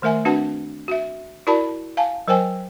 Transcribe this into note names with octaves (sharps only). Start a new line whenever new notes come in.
D#3 A3 A#4 E5 G#5
C4 D4 F#4 B4 F#5 A5
F#4 E5
E4 F#4 A#4 D5 A5 B5
F5 G#5 A5
F#3 A#4 C5 G5 G#5